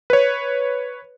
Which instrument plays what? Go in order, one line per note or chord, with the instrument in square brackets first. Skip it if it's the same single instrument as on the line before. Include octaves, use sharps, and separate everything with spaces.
[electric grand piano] B4 C#5